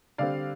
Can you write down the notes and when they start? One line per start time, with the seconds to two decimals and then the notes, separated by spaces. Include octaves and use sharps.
0.18 D3 G3 C4 D5 F5